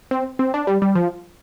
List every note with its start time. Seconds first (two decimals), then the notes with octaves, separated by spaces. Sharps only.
0.11 C4
0.39 C4
0.54 D4
0.67 G3
0.82 G3
0.95 F3